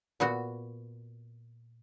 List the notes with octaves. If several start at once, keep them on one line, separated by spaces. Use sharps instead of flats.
A#2 B3 F#4